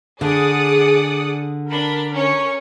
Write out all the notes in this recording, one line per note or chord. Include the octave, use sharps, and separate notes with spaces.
D3 G#4 D5 F#5 D#6
D4 A#4 B5
C#4 C#5